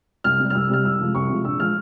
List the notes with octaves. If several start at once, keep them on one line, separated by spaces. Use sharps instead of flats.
C2 F6
C3 G3
F6
C2 E6
C3 G3 F6
C2 E6
C3 F3 G#3
C2 C#6
C3 F3 G#3
A#1 E6
F3 G#3 F6